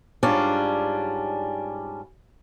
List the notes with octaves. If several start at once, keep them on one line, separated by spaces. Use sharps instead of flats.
G#2 G3 C#4 D4 F4